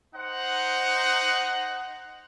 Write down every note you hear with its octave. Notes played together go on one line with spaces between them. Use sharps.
D#4 C5 F#5